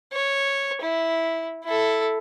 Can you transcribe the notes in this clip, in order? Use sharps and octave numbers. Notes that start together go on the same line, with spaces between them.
C#5
E4
E4 A4